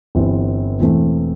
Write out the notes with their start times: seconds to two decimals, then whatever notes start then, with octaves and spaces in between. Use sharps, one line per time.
0.15 G1 G2 E3 C4
0.80 E1 E2 E3 A3 C4